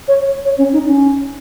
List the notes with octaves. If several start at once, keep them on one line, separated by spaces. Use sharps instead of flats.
C#5
C#5
C#4
D#4
C#4